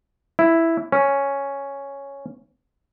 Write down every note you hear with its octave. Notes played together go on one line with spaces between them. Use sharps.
E4
C#4